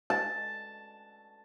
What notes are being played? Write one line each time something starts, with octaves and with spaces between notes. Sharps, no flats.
A5